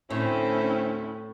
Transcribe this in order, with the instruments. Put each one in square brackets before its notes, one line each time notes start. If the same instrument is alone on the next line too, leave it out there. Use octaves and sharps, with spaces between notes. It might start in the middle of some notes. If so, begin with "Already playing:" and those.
[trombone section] D2 C4 [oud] A2 [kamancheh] C#4 E4